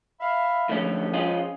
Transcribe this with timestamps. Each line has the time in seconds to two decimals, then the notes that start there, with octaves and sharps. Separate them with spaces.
0.20 E5 F5 B5
0.69 C#2 A2 D3 F3 C#4
1.14 C#4 F4 G#4